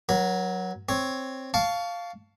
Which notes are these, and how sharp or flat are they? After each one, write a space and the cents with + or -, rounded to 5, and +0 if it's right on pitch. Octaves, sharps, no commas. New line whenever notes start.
F#3 +0 A#4 +45
C4 +5 C#5 +0
F5 +0 A5 +0 C#6 +25